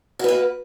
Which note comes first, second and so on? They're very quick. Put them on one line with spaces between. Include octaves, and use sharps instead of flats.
F#4 B4 A#3